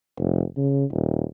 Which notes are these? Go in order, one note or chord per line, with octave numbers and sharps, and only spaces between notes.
F1
C#3
D#1